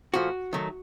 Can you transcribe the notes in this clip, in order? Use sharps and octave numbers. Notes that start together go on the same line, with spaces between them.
A#2 F3 A3 F#4
D#3 F#3 A3